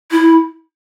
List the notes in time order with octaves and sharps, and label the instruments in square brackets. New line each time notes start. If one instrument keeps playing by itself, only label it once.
[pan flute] E4